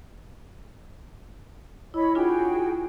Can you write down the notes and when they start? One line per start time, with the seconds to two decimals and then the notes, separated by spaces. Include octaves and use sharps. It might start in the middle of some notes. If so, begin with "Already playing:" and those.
1.94 E4 C#5 D#5 B5
2.15 D4 F4 F#4 G#4 G5